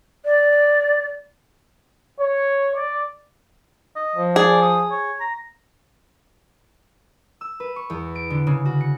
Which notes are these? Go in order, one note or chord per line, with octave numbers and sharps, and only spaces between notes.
D5
C#5
D5
D#5
F3
G#4 D5
D#6
C#5
A#5
E6
B4
C#6
E2
D7
D3
C#3
F#4
C#7